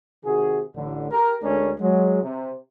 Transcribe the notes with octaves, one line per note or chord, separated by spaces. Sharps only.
C3 D#3 F#4 G#4
A1 D3
G4 A#4
D2 G#3 A3 C#4 D4 A#4
F#3 G#3
C3